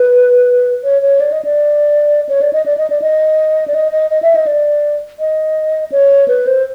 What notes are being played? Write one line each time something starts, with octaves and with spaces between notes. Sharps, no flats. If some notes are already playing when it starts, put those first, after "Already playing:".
Already playing: B4
C#5
C#5
D5
D#5
D5
C#5
D5
D#5
D5
D#5
D5
D#5
D5
D#5
D#5
D#5
E5
D#5
D5
D#5
C#5
B4
C5